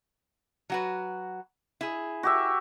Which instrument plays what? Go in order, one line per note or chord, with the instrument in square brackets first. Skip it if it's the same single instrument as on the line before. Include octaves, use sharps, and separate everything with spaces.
[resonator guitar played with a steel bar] F#3 F#4 B4
E4 G#4
[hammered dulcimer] F#4 G4 E5